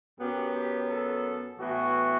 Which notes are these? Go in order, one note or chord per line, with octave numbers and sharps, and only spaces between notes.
F#2 F#3 B3 G4
G4
A4
A2 E3 B3 F#4